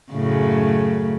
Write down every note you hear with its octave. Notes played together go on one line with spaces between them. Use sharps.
F#2 A2 C#3